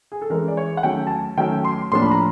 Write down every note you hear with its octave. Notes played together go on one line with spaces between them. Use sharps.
G#4
A4
E3 G#3 C#4 A#4
D5
C#5
F#5
D#3 F#3 A3 C#4 G5
A5
G#5
D#3 F#3 A3 C#4 G5
C6
A2 F3 A#3 D4 C6
B5
A#5